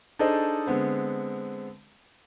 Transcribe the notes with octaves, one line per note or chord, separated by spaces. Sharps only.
D4 D#4 G#4 A4 C5 D#5
D3 G#3 B3 C4